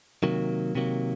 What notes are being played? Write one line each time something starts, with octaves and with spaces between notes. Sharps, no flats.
C3 D#3 F#3 A#3
C3 D#3 F#3 A#3